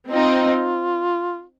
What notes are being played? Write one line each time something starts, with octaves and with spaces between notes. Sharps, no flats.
C4 D#4 F4